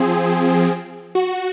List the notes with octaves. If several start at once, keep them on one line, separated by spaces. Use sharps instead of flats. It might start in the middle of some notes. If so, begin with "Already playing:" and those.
Already playing: F3 C4 G#4
F#4